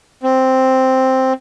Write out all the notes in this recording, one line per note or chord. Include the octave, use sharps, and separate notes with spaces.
C4